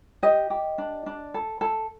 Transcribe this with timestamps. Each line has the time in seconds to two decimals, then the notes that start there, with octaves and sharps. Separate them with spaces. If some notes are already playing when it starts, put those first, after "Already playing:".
0.23 G4 D#5
0.50 G4
0.78 D4
1.06 D4
1.34 A4
1.61 A4